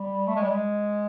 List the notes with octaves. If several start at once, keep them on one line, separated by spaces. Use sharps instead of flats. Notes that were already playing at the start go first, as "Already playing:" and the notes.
Already playing: G3
A3
G#3
G3
G#3